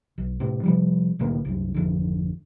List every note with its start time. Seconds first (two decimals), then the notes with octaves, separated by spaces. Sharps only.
0.18 B1
0.40 A2 C3
0.63 C3 F3 G3
1.19 C2 A2 D3 A#3
1.45 C2 F#2
1.74 G#1 F2 D3